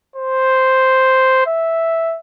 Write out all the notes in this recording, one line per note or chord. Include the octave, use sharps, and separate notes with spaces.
C5
E5